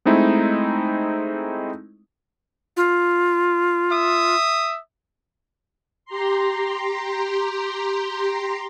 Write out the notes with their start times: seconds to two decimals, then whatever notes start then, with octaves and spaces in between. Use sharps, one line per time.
0.05 G#3 A3 C4 D#4 E4
2.77 F4
3.91 E5 D#6
6.05 G4 A#5 C6